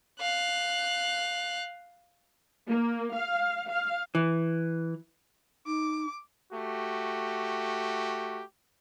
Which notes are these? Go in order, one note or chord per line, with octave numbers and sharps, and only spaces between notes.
F5 F#6
A#3
F5
F5
E3
D#4 D6
A3 F#4 G4